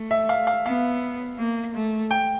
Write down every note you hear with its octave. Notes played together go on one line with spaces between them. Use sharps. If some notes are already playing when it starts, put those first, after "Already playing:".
Already playing: A3
E5
F5
F5
B3 F5
A#3
A3
G5